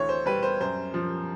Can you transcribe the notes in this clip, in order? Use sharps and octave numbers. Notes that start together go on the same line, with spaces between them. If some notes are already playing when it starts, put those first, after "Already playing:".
Already playing: D2 E3 C#5
C5
G3 B4
C5
F#2 C5
F3